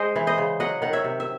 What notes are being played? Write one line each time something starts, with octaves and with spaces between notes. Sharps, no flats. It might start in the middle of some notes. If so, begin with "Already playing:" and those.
Already playing: G#3 C5 D#5
E3
C5 D#5
C#3
F#3 D#5 F#5
D#3 F#5
C#5 E5
C3
E5